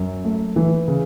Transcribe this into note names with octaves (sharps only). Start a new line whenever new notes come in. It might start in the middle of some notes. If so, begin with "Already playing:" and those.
Already playing: F#2
A3
E3
C#3